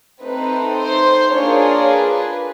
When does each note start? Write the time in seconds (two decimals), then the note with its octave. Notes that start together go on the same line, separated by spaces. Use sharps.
0.23 A3 C4 D#4 B4
0.78 C5
1.32 A#3 D4 F4 G#4 C#5
1.87 B4